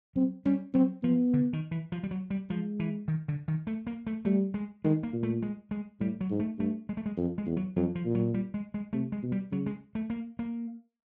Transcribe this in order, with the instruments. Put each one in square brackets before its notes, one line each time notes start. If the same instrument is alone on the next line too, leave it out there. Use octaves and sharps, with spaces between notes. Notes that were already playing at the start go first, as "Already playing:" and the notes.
[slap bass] F#3 [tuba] C4
[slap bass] G3 [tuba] C#4
[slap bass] F#3 [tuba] C4
[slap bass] F3 [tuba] B3
[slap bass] D3
D#3
E3
F3
G3
F#3
G3
[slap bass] F3 [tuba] G#3
[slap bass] E3
D#3
D3
D#3
A3
A#3
A3
[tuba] G3 [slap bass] A3
[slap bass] G#3
[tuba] D#3 [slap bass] G#3
[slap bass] A#3
[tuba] A#2
[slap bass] A3
G#3
G#3
[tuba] A2 [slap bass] G3
[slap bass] F#3
[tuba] G#2
[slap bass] A3
[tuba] G2 [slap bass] A3
[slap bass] G#3
A3
G#3
[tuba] F2
[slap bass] G#3
[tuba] E2
[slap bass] F#3
[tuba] F2 [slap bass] F#3
[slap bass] F3
[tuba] A#2
[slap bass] F#3
G3
G#3
G#3
[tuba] C3 [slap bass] A3
[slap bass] G#3
[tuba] B2
[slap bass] G3
[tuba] C#3 [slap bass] F#3
[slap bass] G#3
A3
A#3
A#3